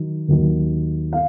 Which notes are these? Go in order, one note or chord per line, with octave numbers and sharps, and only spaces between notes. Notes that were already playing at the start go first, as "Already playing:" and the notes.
Already playing: D#3 F#3
D#2 D#3 F#3
F5